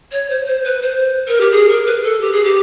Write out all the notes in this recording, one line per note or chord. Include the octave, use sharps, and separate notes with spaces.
C#5
C5
C5
B4
C5
A#4
G4
G#4
A#4
B4
A4
G4
G#4
G4